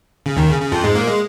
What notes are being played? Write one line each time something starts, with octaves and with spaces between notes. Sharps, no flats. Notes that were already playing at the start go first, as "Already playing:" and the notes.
C#3
D#2 D#3
C#3
C#3
F2 F3
G#2 G#3
A#2 A#3
G#3